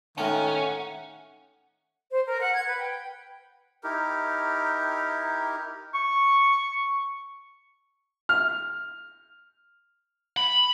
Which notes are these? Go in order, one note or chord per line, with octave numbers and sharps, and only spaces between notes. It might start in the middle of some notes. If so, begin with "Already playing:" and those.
A2 D#3 C#4 F4 F#5 D#6
C5
A#4
F#5
G#6
B4
G5
D#4 E4 G4 A#4
C#6
F6
B5